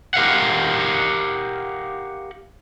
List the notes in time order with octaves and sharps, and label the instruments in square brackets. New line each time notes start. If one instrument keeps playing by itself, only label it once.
[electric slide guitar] G4 A#4 F5 F#5